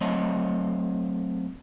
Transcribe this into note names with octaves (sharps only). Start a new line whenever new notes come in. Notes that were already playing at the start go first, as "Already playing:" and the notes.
F#3 A3 C4 C#5 D#5